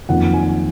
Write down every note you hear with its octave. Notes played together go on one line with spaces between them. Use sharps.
F2 D#3 F#3 A#3 C#4 F#5
G#5